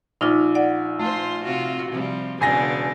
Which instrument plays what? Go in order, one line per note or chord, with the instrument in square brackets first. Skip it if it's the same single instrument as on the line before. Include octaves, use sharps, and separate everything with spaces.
[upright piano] A#1 [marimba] D#4 F4 D6
[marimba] D5 F#5
[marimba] A3 [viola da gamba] F4 C5
[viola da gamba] C3 F4 F#4
C3 F3 G3
[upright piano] E1 G#5 A#6 [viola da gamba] C#3 B3 D4